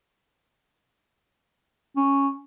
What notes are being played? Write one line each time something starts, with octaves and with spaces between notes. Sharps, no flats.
C#4